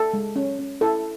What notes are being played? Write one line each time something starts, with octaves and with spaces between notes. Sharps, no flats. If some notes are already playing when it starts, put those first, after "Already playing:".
Already playing: A4
G#3
C#4
C#4
E4 A4